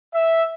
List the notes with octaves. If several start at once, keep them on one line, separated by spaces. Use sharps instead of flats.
E5